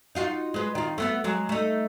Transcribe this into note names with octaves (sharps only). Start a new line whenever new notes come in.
D#4 F4 F#4
G#3 B4
D#3 F4
A3 B3 F#4
F#3 G#3
A3 D#4